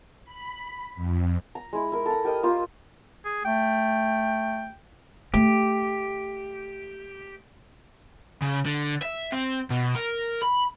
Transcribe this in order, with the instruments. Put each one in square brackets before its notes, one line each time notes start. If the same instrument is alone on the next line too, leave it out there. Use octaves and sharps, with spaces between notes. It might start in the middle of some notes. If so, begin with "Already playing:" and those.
[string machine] B5
F2
[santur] A#5
G#3 E4
E4 A#4
A4 A#5
G4 A#4 D#5
A#3 F4 C5
[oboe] G#4
[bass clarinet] A3 [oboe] G5
[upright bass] A3 [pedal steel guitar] G4
[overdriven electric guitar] C#3
D3
E5
C4
B2
A#4
B5